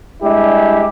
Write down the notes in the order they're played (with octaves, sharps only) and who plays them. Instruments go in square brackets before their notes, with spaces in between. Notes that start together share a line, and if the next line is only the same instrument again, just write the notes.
[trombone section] G3 G#3 D4 E4 G4